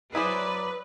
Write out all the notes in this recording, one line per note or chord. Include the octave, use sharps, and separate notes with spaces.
F#3 E4 G#4 B4 C5 D5